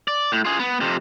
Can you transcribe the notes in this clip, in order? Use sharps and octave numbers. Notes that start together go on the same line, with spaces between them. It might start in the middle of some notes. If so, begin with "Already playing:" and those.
D5
A2
F4 G#4
B3
F2 C3